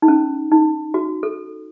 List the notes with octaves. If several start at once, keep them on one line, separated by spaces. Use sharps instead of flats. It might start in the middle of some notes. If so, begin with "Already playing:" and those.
D#4
C#4
D#4
F#4
A4